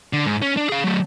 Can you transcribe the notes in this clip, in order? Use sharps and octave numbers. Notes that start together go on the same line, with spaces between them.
D3
G#2
C#4
D4
G#4 F5
F#3 A3